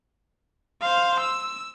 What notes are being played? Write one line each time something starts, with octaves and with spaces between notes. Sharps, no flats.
C5 F5
E6